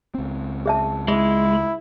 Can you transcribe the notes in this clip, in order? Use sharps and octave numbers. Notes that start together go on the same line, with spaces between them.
C#2 C4
G#4 E5 A5
G#3 E4 G#4